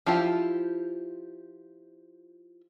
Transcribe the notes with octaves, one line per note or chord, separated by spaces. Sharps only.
F3 E4 F4 G4